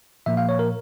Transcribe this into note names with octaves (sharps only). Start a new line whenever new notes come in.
A#2 F3 A#3 E5
F5
C#5
A#4